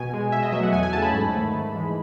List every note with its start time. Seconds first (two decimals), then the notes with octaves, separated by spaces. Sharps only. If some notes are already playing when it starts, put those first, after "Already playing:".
Already playing: B2 G#5
0.13 G#3
0.32 B2 E5
0.43 D#5
0.52 F#3 A3 E5
0.63 F#5
0.73 E2 G#5
0.83 G#5
0.93 C#3 F#3 A3 A5
1.02 B5
1.13 G#2
1.33 D#3 A3
1.53 G#2
1.72 E3 G#3